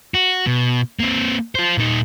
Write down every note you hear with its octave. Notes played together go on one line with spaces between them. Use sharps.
F#4
B2
A#3 C4
F4 C5
A#2 D#4